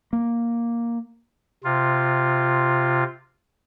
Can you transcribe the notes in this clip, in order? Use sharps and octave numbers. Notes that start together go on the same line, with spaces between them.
A#3
C3 F4